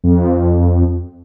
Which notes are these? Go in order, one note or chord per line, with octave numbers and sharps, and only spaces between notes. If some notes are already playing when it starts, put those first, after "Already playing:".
F2